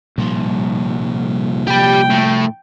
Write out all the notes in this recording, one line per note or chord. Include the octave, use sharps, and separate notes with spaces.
C2 A#2 F3 G3
G4 G5 B5
A2